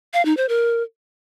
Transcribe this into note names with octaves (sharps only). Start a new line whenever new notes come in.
F5
D#4
C5
A#4